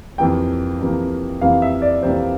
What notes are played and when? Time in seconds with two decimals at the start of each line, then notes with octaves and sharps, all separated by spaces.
0.18 F2 C3 E3 A#3 G5
0.80 F2 C3 E3 A#3
1.41 F2 C3 E3 A#3 F5
1.62 E5
1.82 D5
2.03 F2 C3 E3 A#3 C5